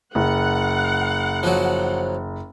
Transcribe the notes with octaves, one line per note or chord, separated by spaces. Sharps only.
F#1 F#5
F3 F#3